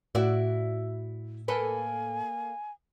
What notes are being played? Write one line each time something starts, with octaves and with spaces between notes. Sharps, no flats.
A2 E4 F#4 D5
A#3 A4 B4 G#5